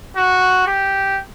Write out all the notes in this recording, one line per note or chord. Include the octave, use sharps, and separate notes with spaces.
F#4
G4